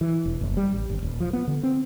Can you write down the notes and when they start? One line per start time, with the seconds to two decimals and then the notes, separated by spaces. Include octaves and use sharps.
0.01 E3
0.26 E1
0.41 F#1
0.57 G3
0.73 A1
0.90 G1
1.02 D#1
1.20 F3
1.33 B3
1.47 D3
1.63 C4